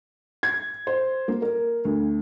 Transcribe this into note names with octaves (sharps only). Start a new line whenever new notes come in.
G#6
C5
A#3
A#4
D2